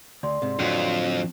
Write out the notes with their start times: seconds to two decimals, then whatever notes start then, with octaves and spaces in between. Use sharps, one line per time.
0.23 D2 D5 C6
0.42 G#2 C3
0.59 F2 A2 D3 F#3